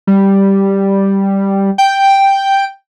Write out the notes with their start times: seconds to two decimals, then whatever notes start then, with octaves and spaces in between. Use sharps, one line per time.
0.07 G3
1.78 G5